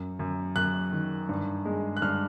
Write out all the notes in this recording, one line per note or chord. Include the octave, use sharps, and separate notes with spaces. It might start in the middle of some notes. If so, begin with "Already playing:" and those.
Already playing: F#2
F#2
F#2 F#6
D#3
G2
G#3
F#6
G2 F6